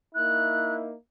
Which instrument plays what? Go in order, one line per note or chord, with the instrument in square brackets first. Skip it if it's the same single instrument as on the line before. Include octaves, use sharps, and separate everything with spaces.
[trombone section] A#3 D#4 E4 [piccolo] F#6